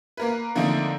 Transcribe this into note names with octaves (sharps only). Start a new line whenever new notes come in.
A#3 A#4 B4
D3 F3 A3 A#3 C4 D#4